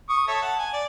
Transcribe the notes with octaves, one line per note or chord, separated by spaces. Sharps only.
C#6 D#6
A4 C#5 E5
F#5 A5
G#5
D5